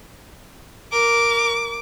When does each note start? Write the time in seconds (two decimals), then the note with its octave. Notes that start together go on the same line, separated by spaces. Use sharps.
0.92 A#4 D6